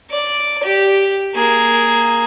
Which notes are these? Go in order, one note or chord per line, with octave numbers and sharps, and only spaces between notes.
D5 D6
G4
A#3 G#4